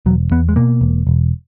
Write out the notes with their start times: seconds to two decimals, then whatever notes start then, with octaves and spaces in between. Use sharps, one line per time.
0.06 E1 F#3
0.31 E2 B3
0.49 G#3
0.56 B2 A#3
0.81 E1
1.07 E1